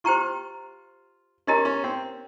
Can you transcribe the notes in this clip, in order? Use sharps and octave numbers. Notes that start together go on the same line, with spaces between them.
F4 G4 C5 G5 A#5 C#6
C#4 D#4 G4 A#4 D#5 A#5
C#4
C4